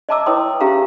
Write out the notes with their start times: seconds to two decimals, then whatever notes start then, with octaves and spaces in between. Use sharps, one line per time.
0.09 D#5 E5 A5 A#5 D6 E6
0.26 E4 B4 C#5 G5 C6 D#6
0.61 C#4 G4 G#4 E5 F5 A#5